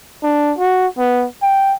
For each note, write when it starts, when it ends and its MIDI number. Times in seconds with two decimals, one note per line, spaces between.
0.23 0.53 62
0.58 0.87 66
0.99 1.26 59
1.42 1.74 79